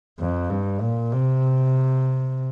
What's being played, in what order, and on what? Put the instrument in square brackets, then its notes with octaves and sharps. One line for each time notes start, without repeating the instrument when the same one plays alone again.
[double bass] F2
G2
A#2
C3